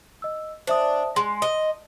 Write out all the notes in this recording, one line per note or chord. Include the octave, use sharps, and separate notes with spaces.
D#5 E6
D4 C5 E5 D#6
G#3 C6
D#5